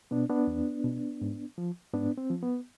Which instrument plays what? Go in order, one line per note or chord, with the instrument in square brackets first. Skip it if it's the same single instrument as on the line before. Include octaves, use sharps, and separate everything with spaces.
[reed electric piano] B2 B3 D4
B3 D4
E2
B2
G#2
F3
G#2 B3 D4
C4
F3
B3